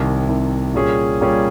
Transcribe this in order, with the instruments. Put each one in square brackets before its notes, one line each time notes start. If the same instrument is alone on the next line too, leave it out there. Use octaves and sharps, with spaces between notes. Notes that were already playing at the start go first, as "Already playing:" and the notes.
Already playing: [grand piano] C2 C3 D#3
C2 C3 D#3
A#2 G3 C#4 G#4
A#2 G3 C#4 G#4